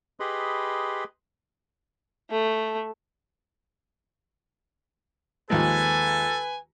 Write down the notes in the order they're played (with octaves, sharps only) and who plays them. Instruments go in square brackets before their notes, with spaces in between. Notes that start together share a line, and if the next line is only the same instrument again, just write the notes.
[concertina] G4 G#4 B4 D#5 B5 C6
[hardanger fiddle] A3
[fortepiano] D#2 F3 G#3 [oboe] A4 [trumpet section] B4 G#5